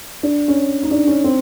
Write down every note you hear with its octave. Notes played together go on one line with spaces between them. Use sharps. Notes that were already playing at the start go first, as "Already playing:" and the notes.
D4
C#4
D#4
D4
C#4
C4